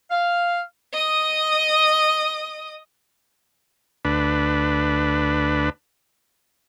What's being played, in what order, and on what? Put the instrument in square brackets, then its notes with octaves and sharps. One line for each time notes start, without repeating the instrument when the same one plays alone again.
[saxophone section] F5
[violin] D#5 D#6
[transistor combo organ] D2 D4 B4